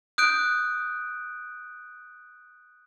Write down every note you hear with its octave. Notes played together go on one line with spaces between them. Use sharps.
D#6 F#6 G6 D7